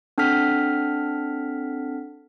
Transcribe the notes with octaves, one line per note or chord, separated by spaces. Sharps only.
C4 D4 A4 F#5 F6 B6